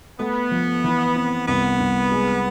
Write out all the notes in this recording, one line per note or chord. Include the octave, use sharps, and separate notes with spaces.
A3 B3
F3
E3
C4
C2 B3
C2
G#3